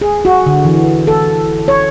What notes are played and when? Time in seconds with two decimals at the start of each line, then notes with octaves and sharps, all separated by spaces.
0.01 G#4
0.25 F#4
0.46 D3
0.65 E3
1.07 A4
1.68 C#5